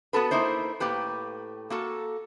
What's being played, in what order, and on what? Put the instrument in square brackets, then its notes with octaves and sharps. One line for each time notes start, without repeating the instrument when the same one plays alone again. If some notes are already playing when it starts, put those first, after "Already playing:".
[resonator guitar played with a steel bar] B3 F#4 A4 B4
A#3 D#4 E4 C5
A2 A#3 G4 B4
A#3 F#4 A4